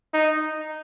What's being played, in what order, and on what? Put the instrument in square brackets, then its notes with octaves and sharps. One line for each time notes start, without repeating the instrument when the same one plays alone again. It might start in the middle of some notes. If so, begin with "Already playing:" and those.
[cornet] D#4